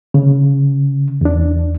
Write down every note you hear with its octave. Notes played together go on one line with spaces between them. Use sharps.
C#3
E2 D4